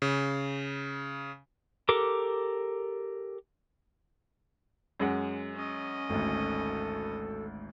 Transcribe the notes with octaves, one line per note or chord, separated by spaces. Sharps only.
C#3
G4 A4 A#4 D6
F#2 G#3 F#5
C#4 D#5
G#1 D2 A4